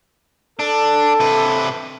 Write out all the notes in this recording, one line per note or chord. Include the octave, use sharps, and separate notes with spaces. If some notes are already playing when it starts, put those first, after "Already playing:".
D4 A4
C3 B4